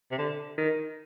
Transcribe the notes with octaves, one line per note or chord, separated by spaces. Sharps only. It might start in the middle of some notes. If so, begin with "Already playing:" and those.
C3
D3
D#3